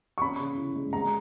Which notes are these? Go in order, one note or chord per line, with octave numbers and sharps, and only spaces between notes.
C#6
C#4 B5
C#3
E4
G#3
G#3 A#5